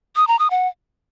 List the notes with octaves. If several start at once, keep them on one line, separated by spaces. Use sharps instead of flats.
D#6
A#5
D#6
F#5